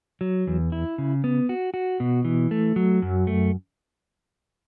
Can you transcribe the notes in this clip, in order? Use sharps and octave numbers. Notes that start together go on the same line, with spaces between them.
F#3
E2
E4
C#3
B3
F#4
F#4
B2
E3
A3
F#3
F#2
A3